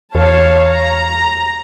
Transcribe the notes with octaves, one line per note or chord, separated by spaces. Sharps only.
E2 C#5 F5 A5
A#5